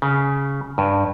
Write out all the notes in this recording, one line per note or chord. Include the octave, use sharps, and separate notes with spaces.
C#3
G2